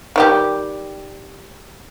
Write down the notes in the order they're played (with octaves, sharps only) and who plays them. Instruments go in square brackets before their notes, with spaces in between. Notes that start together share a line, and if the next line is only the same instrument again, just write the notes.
[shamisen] D#3 G3 G4